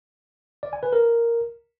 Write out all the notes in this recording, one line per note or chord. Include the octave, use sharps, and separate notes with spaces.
D5
G#5
B4
A#4